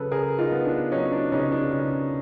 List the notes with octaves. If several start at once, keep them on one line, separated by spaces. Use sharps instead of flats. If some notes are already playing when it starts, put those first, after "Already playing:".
Already playing: C#3 F#3 A4 B4
C#3 G#4 A#4
D#4 F4
B3
D4
F#3 C#4 D#4
D4
C#3 C#4 D#4
D4
C#3 C#4